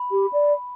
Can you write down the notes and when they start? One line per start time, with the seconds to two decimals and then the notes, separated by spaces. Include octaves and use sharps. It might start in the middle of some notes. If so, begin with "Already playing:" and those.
Already playing: B5
0.11 G4
0.33 D5